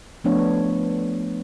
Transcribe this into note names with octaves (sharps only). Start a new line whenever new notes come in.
F3 A3 B3 D4 C#5